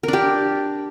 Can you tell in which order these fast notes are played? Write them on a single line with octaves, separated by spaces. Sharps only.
A#4 D4 G4